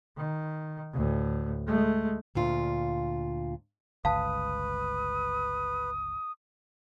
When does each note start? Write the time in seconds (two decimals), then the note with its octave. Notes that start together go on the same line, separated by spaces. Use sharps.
0.17 D#3
0.93 D2 A2
1.67 G#3 A3
2.35 D2 A#2 F4
4.05 G1 C#2 B4 F5 A5 D#6